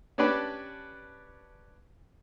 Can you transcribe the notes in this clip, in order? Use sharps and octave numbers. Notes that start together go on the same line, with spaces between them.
C#4 D4 G4 B4 D5 A5